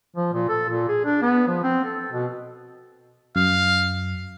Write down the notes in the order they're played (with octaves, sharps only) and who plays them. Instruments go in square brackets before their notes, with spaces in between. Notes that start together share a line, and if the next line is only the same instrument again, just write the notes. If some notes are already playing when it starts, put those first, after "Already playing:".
[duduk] F3
A#2
A4
A#2
G#4
D4
B3
F3
C4
A4
B2
[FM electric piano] F#2 [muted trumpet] F5